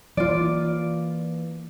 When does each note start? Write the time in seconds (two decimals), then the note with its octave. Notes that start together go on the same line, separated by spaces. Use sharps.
0.17 E3 A#3 F4 D5